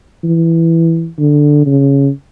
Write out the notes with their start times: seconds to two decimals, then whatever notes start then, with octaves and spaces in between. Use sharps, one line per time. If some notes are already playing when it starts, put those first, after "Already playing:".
0.24 E3
1.19 D3
1.66 C#3